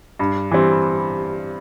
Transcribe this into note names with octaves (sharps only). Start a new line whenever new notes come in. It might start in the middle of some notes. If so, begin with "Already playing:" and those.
G2
E3 G3 C4